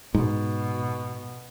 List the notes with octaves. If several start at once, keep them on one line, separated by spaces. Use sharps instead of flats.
G#2 B2